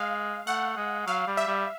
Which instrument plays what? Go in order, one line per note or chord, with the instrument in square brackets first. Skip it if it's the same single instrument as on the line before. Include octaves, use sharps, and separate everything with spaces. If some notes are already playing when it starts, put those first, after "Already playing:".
Already playing: [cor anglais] G#3 [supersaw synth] F5
[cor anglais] A3 [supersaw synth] F#5
[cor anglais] G#3
[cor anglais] F#3 [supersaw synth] F5
[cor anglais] G3
[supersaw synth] E5
[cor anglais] G3